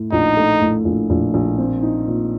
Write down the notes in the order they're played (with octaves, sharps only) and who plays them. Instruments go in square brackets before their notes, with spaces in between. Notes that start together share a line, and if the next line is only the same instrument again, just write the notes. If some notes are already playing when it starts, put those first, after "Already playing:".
Already playing: [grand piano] A2
[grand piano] A#1 [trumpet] D#4
[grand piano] A3
A2
A#1
A#1
A#1
C4
D#4
A#2